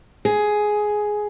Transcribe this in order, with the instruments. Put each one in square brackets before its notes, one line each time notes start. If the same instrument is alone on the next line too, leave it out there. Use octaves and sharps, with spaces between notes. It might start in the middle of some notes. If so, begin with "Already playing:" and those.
[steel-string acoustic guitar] G#4